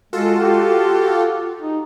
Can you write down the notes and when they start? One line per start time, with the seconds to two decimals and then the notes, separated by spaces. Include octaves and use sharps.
0.13 G#3 F4 F#4 A4
0.41 G4
1.62 D#4